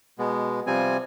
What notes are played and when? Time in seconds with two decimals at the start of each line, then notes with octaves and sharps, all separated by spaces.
0.19 B2 G#3 B3
0.67 C3 F3 G3 C4 G#5